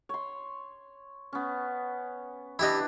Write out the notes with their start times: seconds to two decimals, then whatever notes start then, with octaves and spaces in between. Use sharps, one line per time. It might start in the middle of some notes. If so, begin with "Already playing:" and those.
0.09 C#5 C6
1.33 B3 C#4
2.59 E3 D4 E4 G4 D#5